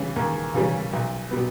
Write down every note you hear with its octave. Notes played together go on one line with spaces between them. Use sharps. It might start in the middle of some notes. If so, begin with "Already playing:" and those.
Already playing: C#3 E3 G3 C#4
D#2
C#3 E3 G3 C#4
B1
B2 G3 B3